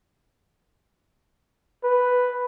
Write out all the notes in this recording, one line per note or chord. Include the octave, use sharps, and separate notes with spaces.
B4